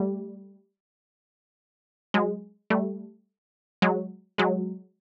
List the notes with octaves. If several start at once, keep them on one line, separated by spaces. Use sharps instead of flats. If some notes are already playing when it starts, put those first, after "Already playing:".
Already playing: G3 A3
F#3 G#3
G3 A3
F#3 G#3
F#3 G#3